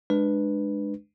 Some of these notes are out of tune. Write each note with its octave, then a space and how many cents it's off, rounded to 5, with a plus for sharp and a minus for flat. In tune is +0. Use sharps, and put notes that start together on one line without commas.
G#3 +5 D4 +25 B4 +0